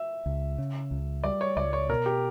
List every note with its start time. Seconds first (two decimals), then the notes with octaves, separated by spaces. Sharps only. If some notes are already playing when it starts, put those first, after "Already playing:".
Already playing: E5
0.26 C#2
0.58 C#3
0.91 C#2
1.24 G3 D5
1.41 C#5
1.56 C#2 D5
1.73 C#5
1.89 B2 A#4
2.06 G4